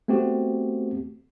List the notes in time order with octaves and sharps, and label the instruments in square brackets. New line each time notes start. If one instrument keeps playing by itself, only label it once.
[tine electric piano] A3 B3 C4 F#4 G4